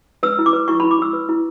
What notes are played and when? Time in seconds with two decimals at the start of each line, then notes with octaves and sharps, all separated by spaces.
0.23 B4 E6
0.39 E4
0.46 D6
0.53 B4
0.68 E4 C#6
0.80 E4 B5
0.91 D6
0.99 E4 E6
1.13 B4
1.29 E4